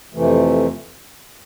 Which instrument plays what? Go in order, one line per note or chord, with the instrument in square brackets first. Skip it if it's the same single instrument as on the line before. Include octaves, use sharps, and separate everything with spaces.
[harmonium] F2 C3 E3 A3